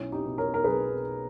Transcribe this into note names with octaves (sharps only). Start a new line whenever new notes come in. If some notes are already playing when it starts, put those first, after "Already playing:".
Already playing: B1 C#4 E4
D#4 G4
B2
A#4 C#5
A#4
B1 G#4 B4